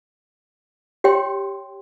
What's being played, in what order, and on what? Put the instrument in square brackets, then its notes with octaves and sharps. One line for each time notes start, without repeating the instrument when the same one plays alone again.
[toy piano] G4 C#5 G5 C6